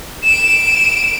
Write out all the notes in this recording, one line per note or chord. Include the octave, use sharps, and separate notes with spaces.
D7 E7